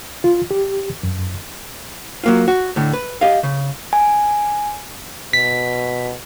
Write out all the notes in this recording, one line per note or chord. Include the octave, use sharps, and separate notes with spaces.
F4
G4
F#2
F#3 A#3 F4
F#4
A2 D3
B4
G4 D#5 F5
C#3
G#5
B2 B6